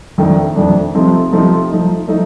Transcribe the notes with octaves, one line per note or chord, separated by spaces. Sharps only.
F2 D#3 A3 D4
F2 D#3 A3 D4
C3 F3 A3 C4 D#4
C3 F3 A3 C4 D#4
F3 A3 D#4
F3 A3 D#4